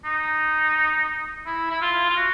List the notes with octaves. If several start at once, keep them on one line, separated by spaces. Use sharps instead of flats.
D#4
E4
E4
F4
F4
F#4